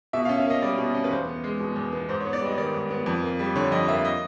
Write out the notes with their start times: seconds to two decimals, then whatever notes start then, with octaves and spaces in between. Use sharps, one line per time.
0.13 B2 E5
0.25 F5
0.29 C#4
0.38 E5
0.46 A#3 D#5
0.62 G3 D5
0.78 B2
0.95 C#4
1.04 B4
1.10 E2 C5
1.27 B3
1.44 G#3
1.60 B2
1.76 E2
1.92 B3
2.09 G#2 C5
2.21 C#5
2.25 B3
2.33 D5
2.42 G3 D#5
2.58 D#3 D5
2.74 G#2
2.90 B3
3.06 F2
3.23 A#3
3.39 G3
3.55 D3 C#5
3.72 F2 D#5
3.88 A#3 E5
4.05 D#5